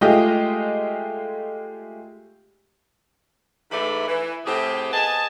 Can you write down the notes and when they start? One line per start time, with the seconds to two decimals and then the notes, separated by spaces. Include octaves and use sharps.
0.01 G#3 A3 F4 G4 G#4 D#5
3.71 G#2 E3 A3 D5 B5
4.08 E3
4.45 A2 C3 C4 G4 G#4
4.92 B3 G#4 D#5 A5